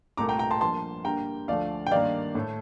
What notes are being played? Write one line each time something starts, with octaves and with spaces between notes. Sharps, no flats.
C2 A#2 A3 A#5 D6
G5 A#5
G5 A#5
A5 C6
G2 F3 A#3 A5 C6
G2 D3 G3 A#3 G5 A#5
D2 D3 F3 A3 D5 F5
G5
G2 D#3 A#3 D5 F5
A2 A3